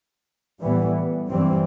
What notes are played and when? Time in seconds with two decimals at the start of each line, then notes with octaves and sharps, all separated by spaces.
0.61 A2 E3 G3 B3
1.30 G2 E3 G3 C4